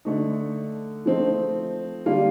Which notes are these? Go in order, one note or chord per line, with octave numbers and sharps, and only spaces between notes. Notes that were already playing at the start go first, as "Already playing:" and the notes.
D3 A3 D#4
F3 A3 C4 D#4
D3 G3 A#3 F4